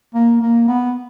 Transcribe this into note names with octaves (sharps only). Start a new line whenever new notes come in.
A#3
A#3
B3